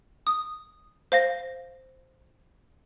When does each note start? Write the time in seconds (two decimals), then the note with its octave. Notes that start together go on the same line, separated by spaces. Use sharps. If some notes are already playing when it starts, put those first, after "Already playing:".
0.27 D#6
1.12 C5 F5 A#6